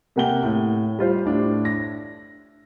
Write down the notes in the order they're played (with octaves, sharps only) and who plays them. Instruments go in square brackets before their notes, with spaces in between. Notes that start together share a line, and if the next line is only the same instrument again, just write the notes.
[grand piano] C3 A#3 F#5 G5 G7
A2
G3 F4 C5
A2 D4
A#6